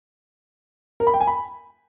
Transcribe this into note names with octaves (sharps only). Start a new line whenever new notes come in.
A#4
B5
G5
G#5
B5